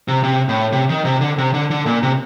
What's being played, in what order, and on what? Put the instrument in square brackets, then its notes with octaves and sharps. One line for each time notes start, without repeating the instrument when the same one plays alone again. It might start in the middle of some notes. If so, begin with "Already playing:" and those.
[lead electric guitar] C3
C3
A2
C3
D#3
C3
D3
C3
D3
D3
A#2
C3